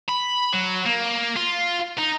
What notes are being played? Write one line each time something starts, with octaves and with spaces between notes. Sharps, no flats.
B5
F#3
A#3
F4
D#4